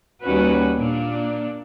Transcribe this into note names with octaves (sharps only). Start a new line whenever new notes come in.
D#2 G3 C#4 F#4 B4
A#2 A#3 D4